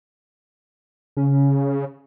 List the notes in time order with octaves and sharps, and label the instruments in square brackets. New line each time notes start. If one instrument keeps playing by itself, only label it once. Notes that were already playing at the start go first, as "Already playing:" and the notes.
[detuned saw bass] C#3 [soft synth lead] C#4